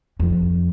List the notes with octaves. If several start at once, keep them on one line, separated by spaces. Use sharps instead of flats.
F2